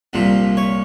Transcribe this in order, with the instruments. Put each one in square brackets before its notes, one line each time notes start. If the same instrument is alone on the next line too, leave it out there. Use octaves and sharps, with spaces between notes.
[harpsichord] C2 A#2 F3
C#5